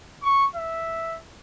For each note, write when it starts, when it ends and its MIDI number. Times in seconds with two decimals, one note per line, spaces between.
0.23 0.46 85
0.55 1.18 76